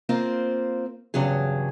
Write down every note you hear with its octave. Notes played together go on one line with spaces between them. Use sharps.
A#3 C4 F4 C5
E2 G2 C#3 F#3 G#4